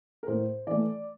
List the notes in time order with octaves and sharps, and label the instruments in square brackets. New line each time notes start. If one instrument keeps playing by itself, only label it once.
[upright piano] A#4
[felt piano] A2 [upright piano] C5
[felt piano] E3 A3 [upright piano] D5